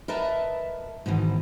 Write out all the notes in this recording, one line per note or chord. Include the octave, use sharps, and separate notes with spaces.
A#4 B4 D#5 E5 A5 A#5
G#2 B2 D#3 E3